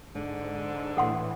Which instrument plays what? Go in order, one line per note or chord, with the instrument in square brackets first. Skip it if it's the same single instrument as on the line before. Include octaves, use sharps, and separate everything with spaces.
[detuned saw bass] G#2 [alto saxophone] D3
[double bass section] A2 [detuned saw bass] E3 [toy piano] A4 F#5 C6